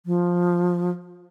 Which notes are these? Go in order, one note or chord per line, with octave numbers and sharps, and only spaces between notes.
F3